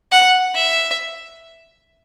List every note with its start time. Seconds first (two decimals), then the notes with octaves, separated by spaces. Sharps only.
0.11 F#5
0.54 E5